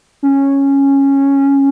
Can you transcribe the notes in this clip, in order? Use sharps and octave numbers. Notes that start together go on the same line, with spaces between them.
C#4